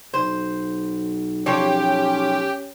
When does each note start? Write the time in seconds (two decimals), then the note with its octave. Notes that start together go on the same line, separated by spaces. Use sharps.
0.14 B1 C5
1.46 F3 C#4 G4 C#5